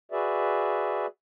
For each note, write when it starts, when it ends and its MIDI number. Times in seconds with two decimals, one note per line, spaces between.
0.12 1.06 66
0.12 1.06 68
0.12 1.06 71
0.12 1.06 74
0.12 1.06 76